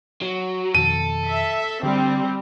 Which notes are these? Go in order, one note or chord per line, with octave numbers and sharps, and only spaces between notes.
F#3
F2 B2 D#3 A4 D#7
E5
D3 G3 C4